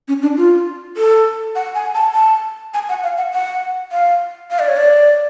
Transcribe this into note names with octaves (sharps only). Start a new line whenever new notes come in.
C#4
D4
F4
A4
F#5
G#5
A5
A5
G#5
F#5
F5
F#5
F#5
F5
F5
D5
C#5
D5